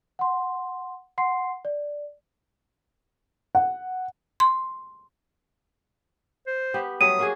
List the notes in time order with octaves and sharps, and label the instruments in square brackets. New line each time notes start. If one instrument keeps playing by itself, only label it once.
[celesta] F#5 C6
F#5 C6 C7
D5
[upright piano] F#5
[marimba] C6
[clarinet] C5
[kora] B3 G4
[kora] F#3 G3 A3 [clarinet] D#6 [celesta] D#7
[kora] A#3 F#4 G#4